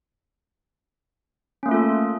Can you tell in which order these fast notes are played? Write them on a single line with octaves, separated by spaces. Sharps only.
C#4 A#3 A3 F4 A4